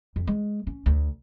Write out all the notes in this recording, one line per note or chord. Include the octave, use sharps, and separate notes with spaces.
F2
G#3
C#4
D2